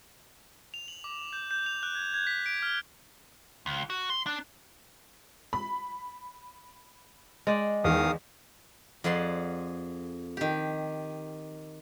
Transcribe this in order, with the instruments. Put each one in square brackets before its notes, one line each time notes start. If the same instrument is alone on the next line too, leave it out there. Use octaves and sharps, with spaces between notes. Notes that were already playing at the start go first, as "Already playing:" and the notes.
[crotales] F7
F#7
D6
G6
G6
F7
F#6
G#6
G#6
B6
D7
F6
[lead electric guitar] C#2
F#4
C6
D4
[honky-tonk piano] B5
[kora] G#3 D5 G5
[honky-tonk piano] E2 [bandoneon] D#3 F5 D#6
[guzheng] F2 G#4 D5 F#5 C6
D#3 G4